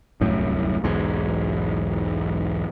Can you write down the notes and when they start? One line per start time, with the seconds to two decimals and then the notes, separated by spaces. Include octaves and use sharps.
0.21 D1 C2 F#2 A2
0.84 B1 E2 G#2